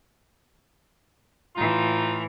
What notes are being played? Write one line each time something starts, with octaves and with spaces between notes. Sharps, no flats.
A2 E3 D#4 F4